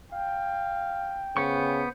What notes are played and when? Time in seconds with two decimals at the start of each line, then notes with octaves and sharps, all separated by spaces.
0.12 F5 G5
1.37 C#3 B3 C5 C#6